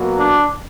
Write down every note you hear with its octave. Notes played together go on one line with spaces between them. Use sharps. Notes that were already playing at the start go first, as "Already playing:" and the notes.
Already playing: B2 F#3 A#3
D4